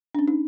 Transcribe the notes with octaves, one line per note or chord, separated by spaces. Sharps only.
D4
C#4
D#4